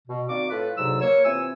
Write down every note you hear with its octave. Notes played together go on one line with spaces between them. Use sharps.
B2
D#3 A#3 C4 F#4 D5 D6
A2 F4 A4 B4
D2 G#2 C3 F#3 E6
A#3 C#5
C3 E3 C4 F4 G#5 E6